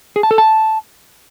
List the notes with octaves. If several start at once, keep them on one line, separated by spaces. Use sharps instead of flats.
G#4
A5
A4
A5